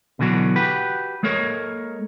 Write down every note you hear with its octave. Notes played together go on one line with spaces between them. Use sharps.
B2 D3 E3 F#3 F#4
F#4 G4 B4
G#3 A#3 A4 A#4 C#5